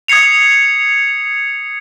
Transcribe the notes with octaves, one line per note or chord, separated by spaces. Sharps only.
D#6 G#6 C7 C#7 F7